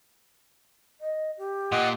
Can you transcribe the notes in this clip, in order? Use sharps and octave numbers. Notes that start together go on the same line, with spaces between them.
D#5
G4
A#2 D#5 F#5